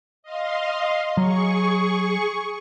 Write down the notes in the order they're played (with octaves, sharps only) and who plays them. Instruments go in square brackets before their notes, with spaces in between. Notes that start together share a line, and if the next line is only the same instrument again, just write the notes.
[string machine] D#5 F5 C6
[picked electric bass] F#3 [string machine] G#4 C#6